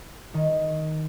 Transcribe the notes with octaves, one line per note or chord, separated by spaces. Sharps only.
D#3